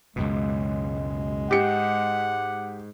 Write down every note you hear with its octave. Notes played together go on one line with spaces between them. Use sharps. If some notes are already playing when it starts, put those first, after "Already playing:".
C#2 F#2 B2 G#3
G#2 G4 F#5 C#7